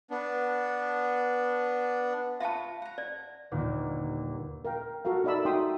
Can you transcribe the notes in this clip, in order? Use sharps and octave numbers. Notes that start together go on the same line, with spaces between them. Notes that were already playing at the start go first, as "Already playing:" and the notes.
B3 D4
F4 E5 A5 B5 C#6
F#5 A#5
D5
G1 D#2 A#2
A#4 F5 G5
F#4 A4 A#4 F5
D#4 A4 D5 E5 B5 E6
D#4 F#4 E5 G5 C6 D#6